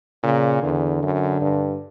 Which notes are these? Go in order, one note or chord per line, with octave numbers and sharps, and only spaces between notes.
A#2 C#3
E2 D3
F#2
G2